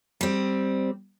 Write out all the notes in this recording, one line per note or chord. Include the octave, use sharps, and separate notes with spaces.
G3 C4